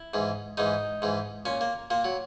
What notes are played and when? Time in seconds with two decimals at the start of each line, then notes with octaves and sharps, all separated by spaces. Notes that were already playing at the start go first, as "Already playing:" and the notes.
Already playing: E4
0.14 G#2 E3
0.57 G#2 E3 D#4
1.02 G#2 E3
1.46 A#2 C#4
1.61 A#3
1.90 A#2 A#3
2.04 F#3